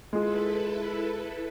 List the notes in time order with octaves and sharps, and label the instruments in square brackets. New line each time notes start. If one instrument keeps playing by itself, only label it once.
[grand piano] G#3 F4 G#4 [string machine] E4 A4 B4